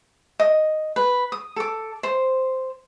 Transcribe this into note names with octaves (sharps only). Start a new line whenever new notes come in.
D#5
B4
D#6
A4 D6
C5